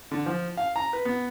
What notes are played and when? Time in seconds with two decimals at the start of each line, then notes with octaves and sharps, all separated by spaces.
0.11 D3
0.26 F3
0.57 F5
0.76 A#5
0.93 B4
1.05 B3